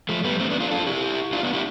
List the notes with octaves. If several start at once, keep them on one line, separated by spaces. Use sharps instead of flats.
F3 A3
G3 B3
A3 C4
B3 D4
D4 F4
F4 A4
E4 G4
D4 F4
B3 D4
E4 G4